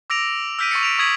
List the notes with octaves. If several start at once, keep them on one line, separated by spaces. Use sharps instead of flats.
D6 E6 A#6 D7 F7
E6 F6 G6 B6 D7 D#7
C#6 A6 C#7
B6 D7 E7 F7
C#6 D#6 G#6 B6 F#7